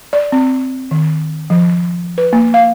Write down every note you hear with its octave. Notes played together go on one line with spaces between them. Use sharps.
D5
C4
D#3
F3
B4
A#3
F5